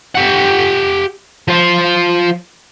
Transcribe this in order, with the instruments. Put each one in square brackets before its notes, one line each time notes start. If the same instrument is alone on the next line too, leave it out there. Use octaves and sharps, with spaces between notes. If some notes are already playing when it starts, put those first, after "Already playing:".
[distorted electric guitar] G4 F#5
F3 C5